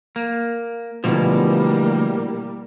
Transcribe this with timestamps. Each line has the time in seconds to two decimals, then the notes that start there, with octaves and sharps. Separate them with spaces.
0.16 A#3
1.04 D2 B2 E3 F3 G3 A#3